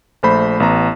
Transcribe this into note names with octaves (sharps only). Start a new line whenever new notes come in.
A#1 A3 C5 B5
A1 B3 A#5